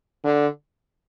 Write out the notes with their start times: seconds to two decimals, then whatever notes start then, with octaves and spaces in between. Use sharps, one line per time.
0.24 D3